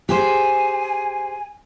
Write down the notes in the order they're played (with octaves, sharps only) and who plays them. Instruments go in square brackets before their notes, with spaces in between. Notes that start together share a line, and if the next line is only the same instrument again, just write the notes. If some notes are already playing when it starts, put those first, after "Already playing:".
[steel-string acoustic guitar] G4 G#4 C5 [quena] G#5